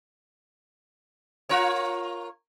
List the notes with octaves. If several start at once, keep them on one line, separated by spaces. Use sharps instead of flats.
F4 A#4 C#5